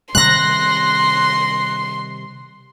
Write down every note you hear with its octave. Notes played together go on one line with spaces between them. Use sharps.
C3 D#3 G3 C6 F#6 A#6